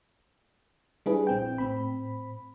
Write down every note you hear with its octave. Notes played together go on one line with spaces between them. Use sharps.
G3 D4 E4 G#4 B4
A#1 C4 G5
A2 C4 B5